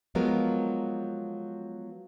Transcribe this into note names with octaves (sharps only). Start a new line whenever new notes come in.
F3 F#3 G#3 B3 F4 A#4